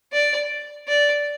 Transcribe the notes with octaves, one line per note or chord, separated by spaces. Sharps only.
D5
D5